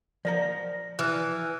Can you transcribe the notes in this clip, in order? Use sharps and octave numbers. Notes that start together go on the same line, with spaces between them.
F3 A#4 D5 A#5 A#6
E3 F6 F#6